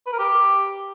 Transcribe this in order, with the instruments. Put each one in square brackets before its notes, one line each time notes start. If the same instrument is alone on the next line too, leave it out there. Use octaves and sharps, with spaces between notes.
[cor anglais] B4
A#4
G4